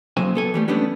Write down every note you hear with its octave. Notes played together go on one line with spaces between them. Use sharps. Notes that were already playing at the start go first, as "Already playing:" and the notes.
C#3 F#3 A#3 C5 G#5
B3 A4 G#5
E3 G3 A3
G3 A3 B3 C#4 D4 G4